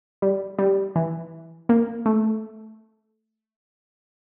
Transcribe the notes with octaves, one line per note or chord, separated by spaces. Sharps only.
G3
G3
E3
A#3
A3